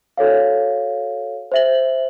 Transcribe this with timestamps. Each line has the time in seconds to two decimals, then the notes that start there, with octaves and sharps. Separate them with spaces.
0.17 F#4 A4 C#5 F5
1.52 C5 E5 F#7